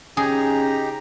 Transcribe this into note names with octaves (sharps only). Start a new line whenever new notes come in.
C#3 D#4 G4 G#4 A#5